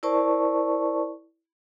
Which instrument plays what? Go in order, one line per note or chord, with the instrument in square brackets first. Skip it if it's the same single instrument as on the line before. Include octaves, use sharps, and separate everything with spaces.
[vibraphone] E4 A#4 C5 D5 A5 C#6